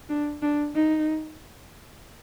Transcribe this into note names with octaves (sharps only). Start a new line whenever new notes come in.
D4
D4
D#4